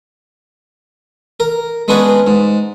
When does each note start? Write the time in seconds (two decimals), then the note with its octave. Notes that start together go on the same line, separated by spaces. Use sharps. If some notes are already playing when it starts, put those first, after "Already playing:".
1.40 A#4
1.88 G#3 B3 C#4 D4 F#4 G#4
2.27 G#2